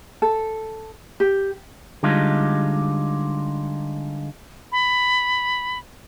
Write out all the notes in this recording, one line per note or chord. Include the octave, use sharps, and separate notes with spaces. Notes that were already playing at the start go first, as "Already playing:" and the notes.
A4
G4
D3 G3 G#3 D#4 F4
B5